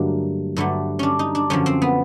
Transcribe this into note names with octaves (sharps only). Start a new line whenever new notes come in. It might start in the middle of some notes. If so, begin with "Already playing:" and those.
Already playing: G2 D3 F#3 A3 A#3
G2 D3 F#3 A3
C#4 D4
D#4
D4
F#2 D3 F3 C#4
C4
B3